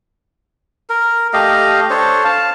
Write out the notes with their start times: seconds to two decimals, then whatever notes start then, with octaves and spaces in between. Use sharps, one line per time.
0.90 A#4
1.33 A3 G4 D#5 F5
1.90 D4 A4 C5 C#5
2.24 F5 A5